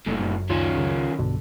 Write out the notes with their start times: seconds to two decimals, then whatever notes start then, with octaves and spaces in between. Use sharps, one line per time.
0.06 F#1 G2 A#2 A3
0.19 F#2
0.50 C#2 D#3 C#4 F4
0.75 C#2 C#3
1.19 B1 G2 B2 D3